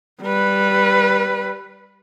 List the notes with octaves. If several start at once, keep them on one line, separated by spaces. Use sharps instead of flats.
G3 B4